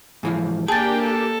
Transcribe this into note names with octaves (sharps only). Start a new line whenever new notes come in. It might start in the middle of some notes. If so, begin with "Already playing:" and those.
G#2 E3 F3
A#3 D4 G4 G#4 G5 A5 A6
A4